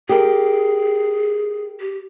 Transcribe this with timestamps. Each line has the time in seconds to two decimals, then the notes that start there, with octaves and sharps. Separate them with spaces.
0.09 G4 G#4 A#4
1.80 G4